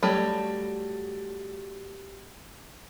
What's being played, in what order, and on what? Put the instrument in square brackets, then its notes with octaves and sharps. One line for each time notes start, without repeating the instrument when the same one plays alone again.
[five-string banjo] F#3 G3 A3